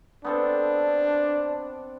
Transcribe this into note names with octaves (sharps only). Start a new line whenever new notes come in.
B3 C4 D4 A4